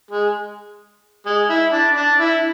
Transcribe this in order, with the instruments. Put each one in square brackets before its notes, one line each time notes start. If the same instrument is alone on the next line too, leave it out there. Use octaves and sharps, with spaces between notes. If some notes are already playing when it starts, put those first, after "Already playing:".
[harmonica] G#3
G#3
E4
D4
D4
E4